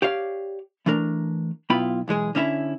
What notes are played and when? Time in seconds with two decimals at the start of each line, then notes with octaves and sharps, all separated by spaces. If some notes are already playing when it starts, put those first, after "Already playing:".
0.02 G4 C#5 D5 F5
0.86 E3 A3 D4 A#4
1.70 B1 B3 E4 F4 G5 B5
2.08 B1 E3 G#3 G#4
2.35 D3 C#4 E4 A#4 E5